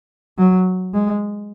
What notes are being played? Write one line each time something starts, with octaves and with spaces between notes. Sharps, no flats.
F#3
G#3